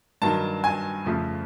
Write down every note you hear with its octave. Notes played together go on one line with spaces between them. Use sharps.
G2 D#3 F#3 A5
G#5
F2 C#3 F3 A3